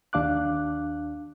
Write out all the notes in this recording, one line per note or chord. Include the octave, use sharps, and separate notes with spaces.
D#2 D4 F5 D6 F#6